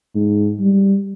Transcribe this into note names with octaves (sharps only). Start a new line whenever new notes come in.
G#2
G3